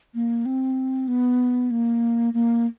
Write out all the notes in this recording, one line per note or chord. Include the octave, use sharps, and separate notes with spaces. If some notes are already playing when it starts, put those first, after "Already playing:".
A#3
C4
B3
A#3
A#3